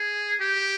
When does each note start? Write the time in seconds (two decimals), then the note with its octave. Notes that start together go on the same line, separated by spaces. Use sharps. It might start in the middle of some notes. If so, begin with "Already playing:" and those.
Already playing: G#4
0.40 G4